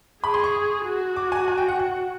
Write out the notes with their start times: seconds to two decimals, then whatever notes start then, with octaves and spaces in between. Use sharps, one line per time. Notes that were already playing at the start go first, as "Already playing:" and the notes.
0.24 G#4 B5
0.34 C6
0.44 C#6
0.86 F#4
1.16 D6
1.32 G#5
1.48 G#5
1.58 G5
1.68 F#5
1.79 F#5